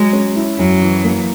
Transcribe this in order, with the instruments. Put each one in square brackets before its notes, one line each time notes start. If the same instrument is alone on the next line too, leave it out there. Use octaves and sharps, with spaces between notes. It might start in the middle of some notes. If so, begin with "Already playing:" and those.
Already playing: [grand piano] F#3 [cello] G#3
[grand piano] C#4
E4
[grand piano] F#2 [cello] F#3
[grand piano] E3
A#3